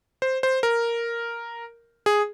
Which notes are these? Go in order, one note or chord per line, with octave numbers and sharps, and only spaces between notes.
C5
C5
A#4
G#4